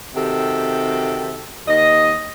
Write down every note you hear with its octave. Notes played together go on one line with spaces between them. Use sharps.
C3 D#3 F#4 G4 A4
D#2 D#5